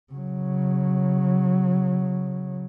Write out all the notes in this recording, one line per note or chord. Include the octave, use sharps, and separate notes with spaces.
C#3 F#3